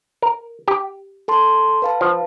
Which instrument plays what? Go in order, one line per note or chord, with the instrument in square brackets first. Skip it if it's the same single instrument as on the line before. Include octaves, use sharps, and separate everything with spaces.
[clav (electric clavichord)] A#4
G4
[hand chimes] A4 A5 C6
B4 F5 A5
[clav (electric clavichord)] F3